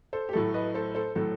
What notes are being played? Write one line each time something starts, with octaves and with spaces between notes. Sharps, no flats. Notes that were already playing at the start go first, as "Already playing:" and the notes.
A4 C5
G4
A2 F#3 A3 A4
B4 D#5
A4 C5
A4 C5
A2 F#3 A3 A4